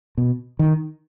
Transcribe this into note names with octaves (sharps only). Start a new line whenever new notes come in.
B2
D#3